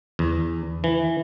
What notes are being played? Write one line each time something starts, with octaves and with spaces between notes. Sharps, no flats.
E2
E3